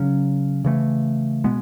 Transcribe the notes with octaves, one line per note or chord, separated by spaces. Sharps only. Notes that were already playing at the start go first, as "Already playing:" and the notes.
Already playing: C#3 F#3 C#4
C#3 E3 A3
B2 G#3 B3